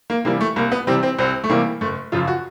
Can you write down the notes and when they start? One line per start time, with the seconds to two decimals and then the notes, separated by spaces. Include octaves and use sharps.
0.10 A#3
0.25 C3 E3 G3 A#3
0.41 A3
0.56 C2 A#3
0.72 B3
0.87 C3 E3 G3 C4
1.03 C4
1.19 C2 C4
1.44 A3
1.50 C3 E3 G3 A#3
1.81 F#1 A3
2.12 F#2 C#3 F3 F4
2.27 F#4